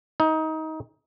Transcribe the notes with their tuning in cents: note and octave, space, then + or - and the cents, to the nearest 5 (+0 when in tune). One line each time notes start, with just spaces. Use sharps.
D#4 +25